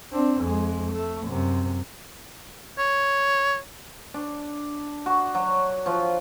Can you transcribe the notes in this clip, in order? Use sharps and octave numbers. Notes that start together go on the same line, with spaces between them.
C4 D4
F2 G#3
A3
F#2 C3
C#5
D4
F#4
F#3
F3